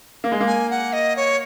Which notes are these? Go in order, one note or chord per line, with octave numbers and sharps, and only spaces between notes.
A#3
G#3
A#3
G#5
F#5
D#5
C#5